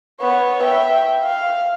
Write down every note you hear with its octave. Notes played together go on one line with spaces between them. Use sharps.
B3 C#5
E5 G5
F5